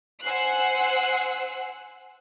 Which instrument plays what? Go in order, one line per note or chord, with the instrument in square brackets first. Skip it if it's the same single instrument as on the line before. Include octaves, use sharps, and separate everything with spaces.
[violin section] C5 F#5 G#5 E6 F#6 C7